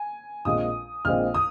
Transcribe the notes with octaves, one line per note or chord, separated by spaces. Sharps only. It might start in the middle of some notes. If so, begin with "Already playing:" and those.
Already playing: G#5
A#1 A#2 G#3 C4 D#6
A#1 A#2 G#3 C4 F6
D#6